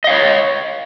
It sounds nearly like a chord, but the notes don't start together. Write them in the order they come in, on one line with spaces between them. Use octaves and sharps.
D#5 F5 C#5